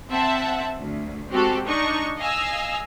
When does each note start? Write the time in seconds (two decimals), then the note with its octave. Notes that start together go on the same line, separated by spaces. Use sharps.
0.10 C4 E5 F#5 A5
0.77 D2
1.31 G#3 C4 F#4 G4 A4
1.66 D4 D#4 C#6
2.17 D#5 F5 G#5 E6